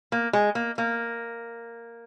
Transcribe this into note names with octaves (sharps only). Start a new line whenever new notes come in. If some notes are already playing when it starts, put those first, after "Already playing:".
A#3
G#3
A#3
A#3